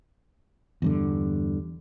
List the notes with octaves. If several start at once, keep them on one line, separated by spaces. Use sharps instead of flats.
E2 G2 D3